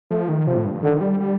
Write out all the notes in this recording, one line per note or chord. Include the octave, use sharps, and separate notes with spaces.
F3 A3
D#3
C3 F3
A2
G2
G2
D3 D#3
G3
G3